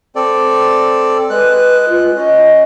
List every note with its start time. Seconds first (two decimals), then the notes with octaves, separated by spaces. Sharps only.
0.16 C4 A4 D5
1.30 G#3 B4 F#6
1.89 F4
2.16 C#4 D#5